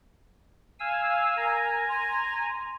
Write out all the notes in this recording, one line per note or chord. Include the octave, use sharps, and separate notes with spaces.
F5 G#5 E6
A#4 G#5 A#5
C6